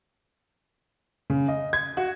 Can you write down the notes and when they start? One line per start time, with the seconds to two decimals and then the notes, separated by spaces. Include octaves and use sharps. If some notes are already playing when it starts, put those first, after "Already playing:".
1.30 C#3
1.48 D#5
1.73 G#6
1.97 F#4